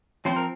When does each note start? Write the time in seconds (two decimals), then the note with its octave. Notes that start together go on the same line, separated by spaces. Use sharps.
0.25 F3 C4 C5
0.36 A#4